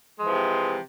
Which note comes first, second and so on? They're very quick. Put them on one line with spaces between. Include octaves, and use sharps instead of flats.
G#3 F3 E3 C3